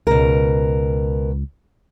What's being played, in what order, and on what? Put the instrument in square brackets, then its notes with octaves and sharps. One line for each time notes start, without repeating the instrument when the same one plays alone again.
[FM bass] C#2 [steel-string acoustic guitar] B2 A#4